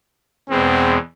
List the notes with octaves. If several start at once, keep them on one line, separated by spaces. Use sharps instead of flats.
E2 B2 G#3 C4